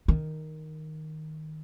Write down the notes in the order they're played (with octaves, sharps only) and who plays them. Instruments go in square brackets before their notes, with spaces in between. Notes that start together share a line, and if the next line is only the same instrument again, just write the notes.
[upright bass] D#3